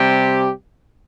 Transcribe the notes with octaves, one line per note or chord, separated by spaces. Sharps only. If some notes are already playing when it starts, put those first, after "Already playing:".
Already playing: C3 G3 C4 G4